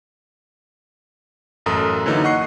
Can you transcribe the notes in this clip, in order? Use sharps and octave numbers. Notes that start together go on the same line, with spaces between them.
A1 F#2 A4 A#4 D#6
D3 E3 F#3 A#3 D#4
D#5 F#5 C#6 F#6 C7